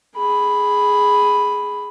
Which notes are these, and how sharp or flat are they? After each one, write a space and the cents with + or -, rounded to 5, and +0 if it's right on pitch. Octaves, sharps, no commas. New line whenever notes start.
G#4 +0 B5 +0